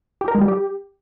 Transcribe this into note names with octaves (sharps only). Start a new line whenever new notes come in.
G4
A#4
G#3
G3
G4